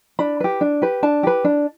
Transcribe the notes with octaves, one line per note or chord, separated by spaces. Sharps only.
D4 B5
G4 B4
D4
G4 B4
D4 A5
G4 B4
D4